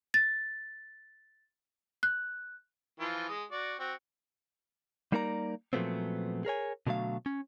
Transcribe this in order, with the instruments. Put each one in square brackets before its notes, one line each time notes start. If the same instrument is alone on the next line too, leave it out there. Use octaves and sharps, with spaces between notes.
[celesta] A6
F#6
[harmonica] E3 F3 F4
G#3 D#6
F#4 D5
C4 F#4
[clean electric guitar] G3 A#3 D#4 A#4 D5 A#5
A#2 F3 F#3 A3 B3 C4
G#4 A#4 C#5 G#5
B2 D3 F#3 A3 F5
C#4